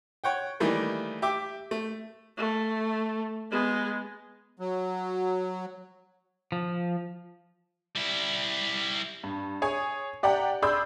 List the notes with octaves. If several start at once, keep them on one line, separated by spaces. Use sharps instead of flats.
C#5 F#5 G5
D#3 E3 G3 A3 A#3
G4 E5 D6
A3
A3
G#3 B3
F#3
F3
G3 E4
G2
G#4 C#5 G#5
G4 D5 F#5 G5 A#5
G#4 D5 B5 C6 E6 G6